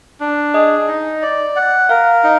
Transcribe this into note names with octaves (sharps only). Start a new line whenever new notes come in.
D4
G#4 D#5
D#4
D5
F#5
A#4 F5
D#4